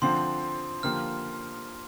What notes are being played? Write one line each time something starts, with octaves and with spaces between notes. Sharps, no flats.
D3 F3 C4 C6
D3 F3 A#3 G4 F6